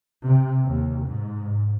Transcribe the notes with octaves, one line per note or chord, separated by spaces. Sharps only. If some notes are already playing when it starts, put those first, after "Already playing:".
C3
D#2
G#2